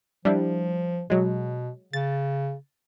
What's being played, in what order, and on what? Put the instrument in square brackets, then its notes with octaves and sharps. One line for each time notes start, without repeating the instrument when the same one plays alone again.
[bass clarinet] F3 [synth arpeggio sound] G3 D4 E4
[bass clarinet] B2 [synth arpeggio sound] F#3 G#3
[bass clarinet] C#3 [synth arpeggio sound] A6